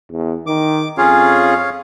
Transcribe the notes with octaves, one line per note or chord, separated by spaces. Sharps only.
E2
D#3 D6
F2 C#4 F4 G#4 C#5 F5